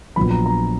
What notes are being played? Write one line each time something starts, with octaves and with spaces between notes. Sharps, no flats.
A#1 A#2 F#3 B3 B5
A#5
A#5